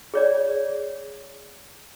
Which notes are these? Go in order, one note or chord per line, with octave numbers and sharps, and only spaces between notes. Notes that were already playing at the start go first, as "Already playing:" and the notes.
G#4 C#5 D5